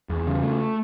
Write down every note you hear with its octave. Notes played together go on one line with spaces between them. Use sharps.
E2
C#3
A3